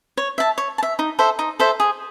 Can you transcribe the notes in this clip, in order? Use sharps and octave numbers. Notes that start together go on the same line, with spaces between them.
C#5
E5 A5
C#5
A5
E5
D#4
A4 C5 E5
D#4
A4 C5 E5
G#4